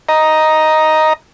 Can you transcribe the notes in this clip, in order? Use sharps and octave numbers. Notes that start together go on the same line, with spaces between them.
D#5 A#5